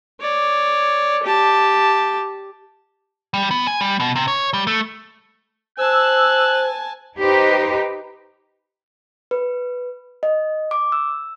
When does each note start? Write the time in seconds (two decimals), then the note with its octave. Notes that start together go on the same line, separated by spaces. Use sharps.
0.21 C#5 D5
1.23 G4 A5
3.34 G3
3.51 B3
3.67 G#5
3.81 G3
4.00 B2
4.16 C3
4.28 C#5
4.53 G3
4.67 A3
5.78 C5 G#5 A5 E6 F#6
7.19 D#4 G4 B4 C5
9.31 B4
10.23 D#5
10.71 D6
10.92 E6